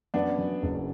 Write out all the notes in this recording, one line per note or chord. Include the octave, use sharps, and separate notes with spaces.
F#2 B3 D4
F#2
F#1